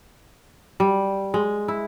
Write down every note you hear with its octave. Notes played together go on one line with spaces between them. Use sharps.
G3
G#3
E4